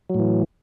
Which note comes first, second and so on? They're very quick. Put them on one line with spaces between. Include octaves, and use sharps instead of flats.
F#3 A2 E3